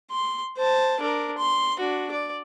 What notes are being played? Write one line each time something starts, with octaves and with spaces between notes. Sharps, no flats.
C6
C5 A5
D4 A#4
C6
D4 F#4
D5